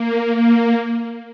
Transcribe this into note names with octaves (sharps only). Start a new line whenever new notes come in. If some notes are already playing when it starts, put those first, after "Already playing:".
Already playing: A#3
A#3